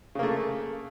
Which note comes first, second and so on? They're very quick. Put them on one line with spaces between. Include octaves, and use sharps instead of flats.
C#3 A#3 A3